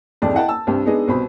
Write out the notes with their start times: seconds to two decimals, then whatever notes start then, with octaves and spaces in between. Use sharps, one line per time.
0.22 E1 C2 F2 G#2 D5
0.34 E4 D#5 F#5 G5 A5
0.48 A5 E6
0.67 C2 G2 C4 G4
0.86 G#3 B3 D4 D#4 G#4 D#5
1.08 C2 B2 C5 B5